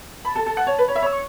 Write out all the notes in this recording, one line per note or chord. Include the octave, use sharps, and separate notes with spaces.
A5 B5
A4
A4
F#5
C#5
B4
C#5 B5
E5
C#5 E6
C#6